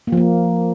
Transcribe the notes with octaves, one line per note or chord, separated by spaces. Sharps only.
A#3
F3
A#3